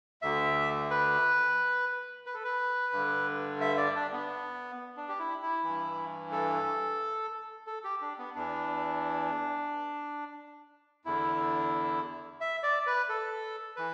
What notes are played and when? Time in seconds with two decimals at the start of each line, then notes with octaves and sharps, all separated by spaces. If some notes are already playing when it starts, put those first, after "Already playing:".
0.22 D2 D3 E5
0.90 B4
2.26 B4
2.34 A4
2.45 B4
2.93 G2 D3
3.61 E5
3.77 D5
3.95 D4
4.12 B3
4.97 D4
5.09 G4
5.19 E4
5.42 E4
5.63 G2 E3
6.32 A4
7.67 A4
7.84 G4
8.01 D4
8.18 B3
8.35 E2 E3 D4
11.05 E2 D3 E4
12.41 E5
12.63 D5
12.87 B4
13.09 A4
13.76 E3 B4